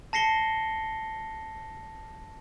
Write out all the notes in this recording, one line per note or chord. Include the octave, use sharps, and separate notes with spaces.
A5 A#6 C7 C#7 G7